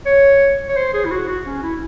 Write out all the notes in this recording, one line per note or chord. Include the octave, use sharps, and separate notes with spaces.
C#5
C#5
C5
G#4
E4
F#4
F#4
C#4
E4